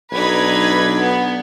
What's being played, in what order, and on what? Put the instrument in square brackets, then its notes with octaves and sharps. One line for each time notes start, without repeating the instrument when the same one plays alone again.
[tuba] B1 [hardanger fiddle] D4 D#4 [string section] B4 B5 G#6
[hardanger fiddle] B3